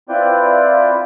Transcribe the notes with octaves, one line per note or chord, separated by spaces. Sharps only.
C4 E4 F4 B4 D5 G5